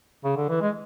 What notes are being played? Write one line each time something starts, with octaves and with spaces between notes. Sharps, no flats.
C#3
D3
E3
G#3